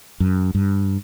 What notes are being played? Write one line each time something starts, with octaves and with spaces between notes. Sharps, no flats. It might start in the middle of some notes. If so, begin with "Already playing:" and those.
F#2
G2